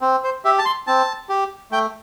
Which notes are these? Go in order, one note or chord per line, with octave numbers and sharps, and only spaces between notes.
C4
C5
G4 E5
A5
C6
C4 A5
G4
A3 G5